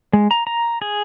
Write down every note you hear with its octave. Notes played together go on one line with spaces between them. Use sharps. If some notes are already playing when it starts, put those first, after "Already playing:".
G#3
A#5
A#5
G#4